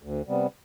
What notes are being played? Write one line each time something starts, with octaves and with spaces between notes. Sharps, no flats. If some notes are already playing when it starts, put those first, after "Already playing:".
D2
C3 G3 B3